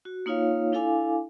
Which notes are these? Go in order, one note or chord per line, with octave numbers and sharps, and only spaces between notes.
F#4
A#3 D#4 F4 C#5 F5
D4 E4 A4 F5 G#5 D6